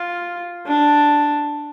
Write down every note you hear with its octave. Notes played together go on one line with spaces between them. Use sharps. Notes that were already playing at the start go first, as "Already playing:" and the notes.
Already playing: F4
D4